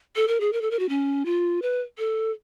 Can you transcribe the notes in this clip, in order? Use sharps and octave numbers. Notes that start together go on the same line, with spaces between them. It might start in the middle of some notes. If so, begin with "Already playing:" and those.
A4
A#4
G#4
A#4
A4
A#4
F#4
C#4
F4
B4
A4